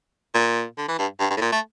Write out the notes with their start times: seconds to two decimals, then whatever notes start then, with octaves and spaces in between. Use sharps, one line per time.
0.34 A#2
0.77 D3
0.88 E3
0.99 G2
1.20 G2
1.30 G2
1.37 A2
1.41 A#2
1.52 A3